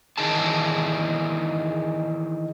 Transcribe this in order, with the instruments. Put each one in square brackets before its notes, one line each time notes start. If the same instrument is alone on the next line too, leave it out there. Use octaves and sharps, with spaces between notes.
[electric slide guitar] D#3 E3 D#4 G#4 A5